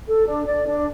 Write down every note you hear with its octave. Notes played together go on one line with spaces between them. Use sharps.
A4
D4
D5
D4